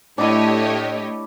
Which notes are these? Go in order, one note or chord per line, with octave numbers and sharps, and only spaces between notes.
A2 A3 D4 E4 G4 C#5 D#5